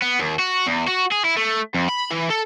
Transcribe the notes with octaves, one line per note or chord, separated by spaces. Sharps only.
B3
D#2
F#4
E2
F#4
G#4
E4
A3
F2
B5
E3
A4